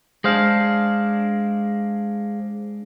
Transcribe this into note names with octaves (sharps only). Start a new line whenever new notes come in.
G#3 D4 G#4 C5 F5